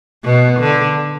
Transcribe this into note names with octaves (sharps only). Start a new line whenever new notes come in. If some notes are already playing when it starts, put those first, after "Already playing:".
B2 B3
D3